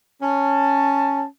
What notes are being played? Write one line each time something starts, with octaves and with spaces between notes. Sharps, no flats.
C#4 A5